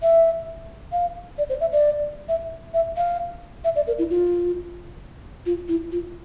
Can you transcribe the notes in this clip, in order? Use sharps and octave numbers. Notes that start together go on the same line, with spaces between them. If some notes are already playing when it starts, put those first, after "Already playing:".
E5
F5
D5
C5
E5
D5
E5
E5
F5
E5
D5
A#4
E4
F4
F4
E4
F4